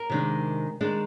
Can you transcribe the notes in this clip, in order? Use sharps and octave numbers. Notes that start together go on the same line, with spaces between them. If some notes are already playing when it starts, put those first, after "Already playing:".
Already playing: A#4
C3 D#3 G#3 D4
D#3 G#3 D4